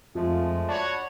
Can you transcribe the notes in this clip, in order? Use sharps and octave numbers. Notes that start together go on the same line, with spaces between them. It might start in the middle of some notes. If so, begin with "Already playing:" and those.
F2 F3 G#3 A3 F4
F#4 C#5 D5 A5 B5